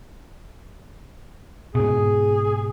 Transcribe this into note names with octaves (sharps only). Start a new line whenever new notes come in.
G#2 B2 G#4